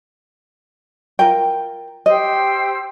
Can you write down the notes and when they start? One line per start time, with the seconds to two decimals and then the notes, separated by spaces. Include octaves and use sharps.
1.19 F4 A#4 G5
2.06 G4 C5 D#5 E6